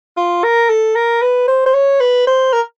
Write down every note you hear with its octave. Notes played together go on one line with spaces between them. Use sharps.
F4
A#4
A4
A#4
B4
C5
C5
C#5
B4
C5
A#4